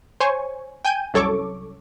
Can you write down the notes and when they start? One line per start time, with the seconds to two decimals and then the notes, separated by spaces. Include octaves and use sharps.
0.20 C5 C#5 G#5 C#6
0.85 G5 G#5 G6 D#7
1.14 C2 F#2 A4 C#5 C#6 D6